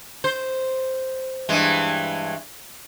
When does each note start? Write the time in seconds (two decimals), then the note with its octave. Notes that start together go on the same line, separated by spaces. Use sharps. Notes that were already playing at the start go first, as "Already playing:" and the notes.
0.24 C5
1.49 G2 E3 G#3